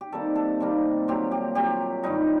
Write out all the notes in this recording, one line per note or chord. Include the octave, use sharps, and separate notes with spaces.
G4
C3 D#3 G3 A#3 A4
A4
C3 D#3 G3 A#3
A#2 F#3 C4 G4
G4
A#2 F#3 C4 G4
G2 D#3 G3 D#4